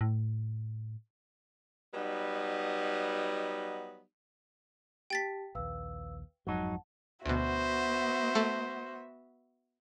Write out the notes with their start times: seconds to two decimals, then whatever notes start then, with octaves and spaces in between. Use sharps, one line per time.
0.01 A2
1.94 F#3 G3 B3 D#4 D#5
5.10 G4 G5 A5 A6 B6
5.55 A#1 D#2 B4 F5 E6
6.47 G1 F2 G#2 F#3 D#4 F#5 A5
7.26 D2 B2 B3 F#4 C5 E5
8.35 A3